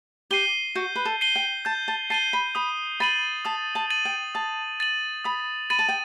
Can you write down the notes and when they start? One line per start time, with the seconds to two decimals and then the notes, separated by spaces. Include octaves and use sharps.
0.31 G4 C7 D#7 G7
0.75 F#4 G6
0.96 B4
1.05 A4
1.21 C7 D#7 G7
1.36 G5
1.65 A5 G6
1.88 A5
2.10 A5 C7 D#7 G7
2.33 B5
2.55 B5 D#6
3.00 B5 A6 D#7 F#7
3.45 A5 D#6
3.75 A5
3.90 A6 D#7 F#7
4.05 G5
4.35 A5 D#6
4.80 A6 D#7 F#7
5.25 B5 D#6
5.70 B5 A6 D#7 F#7
5.79 A5
5.89 G5